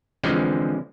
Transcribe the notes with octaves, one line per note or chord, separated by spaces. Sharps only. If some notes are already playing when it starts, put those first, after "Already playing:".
D3 E3 F3 G#3 C4 C#4